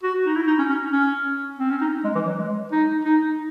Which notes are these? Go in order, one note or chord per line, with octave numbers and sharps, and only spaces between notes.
F#4
D#4
E4
D#4
C#4
C#4
C#4
C4
C#4
D#4
G#3
E3
F#3
G#3
D#4
D#4